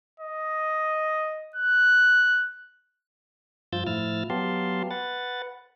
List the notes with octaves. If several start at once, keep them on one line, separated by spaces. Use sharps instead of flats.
D#5
F#6
G2 F3 F4 E6 G6 A6
A2 F3 E4 E6 F6 A6
F#3 B3 G4 F5 A5 C6
B4 F#5 A6